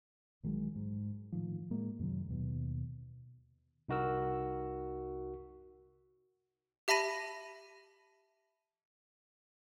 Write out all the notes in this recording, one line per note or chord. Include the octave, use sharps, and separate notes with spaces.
A#1 D#3 F#3 G#3
G#2
A2 D#3 F3
A2 G#3 A#3
F#2 C3 D#3 F#3
D#2 B2 D#3
C2 D#4 F#4 A#4 E6
G4 E5 A5 B5 A#6 D#7